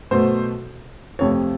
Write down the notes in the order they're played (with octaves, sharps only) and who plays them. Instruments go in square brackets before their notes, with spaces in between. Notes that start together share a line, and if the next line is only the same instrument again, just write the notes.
[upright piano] B2 F#3 A3 C5
F2 C3 F3 A3 C#5